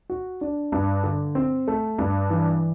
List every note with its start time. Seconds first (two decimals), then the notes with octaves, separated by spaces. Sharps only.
0.10 F#4
0.41 D4
0.72 G2
1.04 D3
1.35 C4
1.68 A3
1.99 G2
2.30 E3